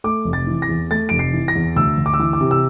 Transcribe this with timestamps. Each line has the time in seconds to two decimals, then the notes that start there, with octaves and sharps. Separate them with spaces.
0.04 A3 D6
0.25 F1
0.33 A6
0.47 E3
0.62 A#6
0.69 E2
0.91 A3 A6
1.09 F1 D7
1.19 C7
1.33 E3
1.48 A#6
1.56 E2
1.76 D2 E6
1.98 D2
2.06 D6
2.13 E6
2.19 E3 D6
2.33 D6
2.40 C3
2.51 E6